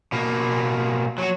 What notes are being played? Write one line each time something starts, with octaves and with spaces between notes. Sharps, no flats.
B2 A#3
F#3 F#4